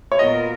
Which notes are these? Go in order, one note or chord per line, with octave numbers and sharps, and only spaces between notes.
C#5
A#2 F#3 B3 F4 A#4 D#5